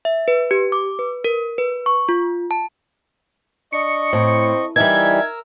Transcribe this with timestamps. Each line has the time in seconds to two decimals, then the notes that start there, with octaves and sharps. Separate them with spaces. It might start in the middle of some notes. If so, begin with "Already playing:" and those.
0.05 E5
0.28 B4
0.51 G4
0.72 D6
0.99 B4
1.24 A#4
1.58 B4
1.86 C#6
2.09 F4
2.51 A5
3.73 D4 D#5 C#6 C#7
4.13 A2 C4
4.76 E3 G3 D#4 A#4 E6 G#6